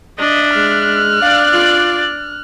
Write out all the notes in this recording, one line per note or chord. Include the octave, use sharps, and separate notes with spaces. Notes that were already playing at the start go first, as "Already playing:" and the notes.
D4 D#5 E5
G#3 F6 F#6
D4 D5 F5
F4